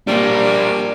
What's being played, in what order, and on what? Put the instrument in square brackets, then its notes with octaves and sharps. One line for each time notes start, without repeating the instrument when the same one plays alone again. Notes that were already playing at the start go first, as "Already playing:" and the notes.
[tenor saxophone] G3 [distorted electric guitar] A#3 D4